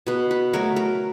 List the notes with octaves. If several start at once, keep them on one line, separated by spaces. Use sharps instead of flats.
B2 B4
B4
F#3 A3 A#4
A#4